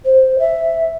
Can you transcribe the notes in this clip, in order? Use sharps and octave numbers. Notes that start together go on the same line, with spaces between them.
C5
E5